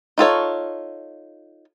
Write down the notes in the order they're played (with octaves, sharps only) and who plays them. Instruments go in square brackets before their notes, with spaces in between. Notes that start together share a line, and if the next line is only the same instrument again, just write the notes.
[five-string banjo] D#4 F4 A4 C#5